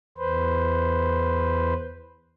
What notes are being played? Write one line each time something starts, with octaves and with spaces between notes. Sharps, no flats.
E2 B4 C5